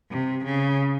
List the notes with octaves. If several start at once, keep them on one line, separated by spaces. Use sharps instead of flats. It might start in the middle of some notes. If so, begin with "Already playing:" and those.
C3
C#3